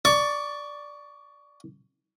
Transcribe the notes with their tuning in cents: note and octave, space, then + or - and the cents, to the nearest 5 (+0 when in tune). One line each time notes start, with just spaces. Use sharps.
D5 +0 C#6 +15